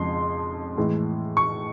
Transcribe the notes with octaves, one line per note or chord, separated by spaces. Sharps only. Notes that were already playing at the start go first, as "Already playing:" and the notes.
Already playing: F2 C#3 F3 G#3 C6
A2 E3 G#3
C#6